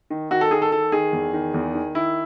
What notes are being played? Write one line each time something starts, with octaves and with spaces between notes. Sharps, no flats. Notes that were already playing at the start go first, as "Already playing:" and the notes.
D#3
D#3 F#4
A4
D#3 G#4
A4
D#3 A4
D#3 G#4
E2
D#3
E2
D#3
D#3 E4